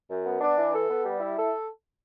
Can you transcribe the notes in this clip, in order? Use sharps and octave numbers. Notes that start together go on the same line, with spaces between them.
F#2
B3
D4
E3
A4
B3
G3
E4
A4